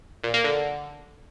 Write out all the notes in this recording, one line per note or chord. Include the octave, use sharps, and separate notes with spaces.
A#2
A#3
D3